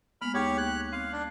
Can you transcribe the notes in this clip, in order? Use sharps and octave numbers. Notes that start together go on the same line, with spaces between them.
G#3 A#3 B3 B5 F6
D2 D#4 G4 G#4 C#5
F#6
C4 F5
D4